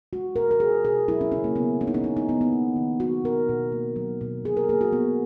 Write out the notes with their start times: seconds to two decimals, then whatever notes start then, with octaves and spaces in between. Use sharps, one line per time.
0.13 G#3 F#4
0.36 B2 A#4
0.51 A#4
0.60 G#3 G#4
0.84 B2 G#4
1.08 F#3 E4
1.21 C#4
1.32 C#3 C#4
1.44 A#3
1.56 C#3 B3
1.81 A#3 C#4
1.87 D#4
1.94 C#4
2.04 A#3 D#4
2.17 D#4
2.29 D#3 B3
2.41 B3
2.52 A#3
2.76 D#3
3.00 F#3 F#4
3.24 B2 A#4
3.49 B2
3.72 A#3
3.96 F#3
4.21 B2
4.44 B2 G#4
4.57 A#4
4.69 A#3 G#4
4.81 F#4
4.93 A#3 B3